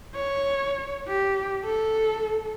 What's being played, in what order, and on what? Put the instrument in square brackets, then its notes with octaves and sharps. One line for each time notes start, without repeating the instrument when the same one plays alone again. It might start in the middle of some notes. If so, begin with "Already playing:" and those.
[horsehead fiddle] C#5
G4
A4